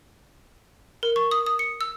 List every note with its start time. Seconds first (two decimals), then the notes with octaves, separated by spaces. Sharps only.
1.03 A#4
1.16 C#6
1.31 D#6
1.46 D#6
1.59 C#7
1.81 E6